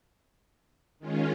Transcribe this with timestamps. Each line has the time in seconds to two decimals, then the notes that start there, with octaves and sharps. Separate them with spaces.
0.99 D#3 G#3 C#4 F4